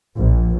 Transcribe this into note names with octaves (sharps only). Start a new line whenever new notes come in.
A#1